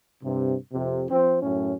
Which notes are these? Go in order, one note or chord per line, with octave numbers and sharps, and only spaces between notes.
G2 C3
F2 C3
F3 C4
F#2 A2 C#4